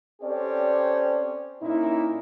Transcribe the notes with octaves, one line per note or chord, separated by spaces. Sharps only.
C4 C#4 G4 A4 C5 D5
A#2 A#3 C#4 D#4 E4